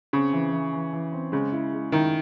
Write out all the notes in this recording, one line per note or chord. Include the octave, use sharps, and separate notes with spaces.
C#3 C4
E3
E3
E3
E3
C4
C#3 G#3
E4
G#3
D#3 E4